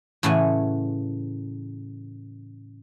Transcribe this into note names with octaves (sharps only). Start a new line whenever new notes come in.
A2 C#3 E3 C#5 F#5 G#5